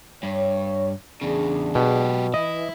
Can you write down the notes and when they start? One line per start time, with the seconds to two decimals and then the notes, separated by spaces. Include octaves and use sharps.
0.23 G2 C#5
1.22 E2 C#3 D4 G#4
1.75 B2 F#3 G4
2.34 E3 E4 D#5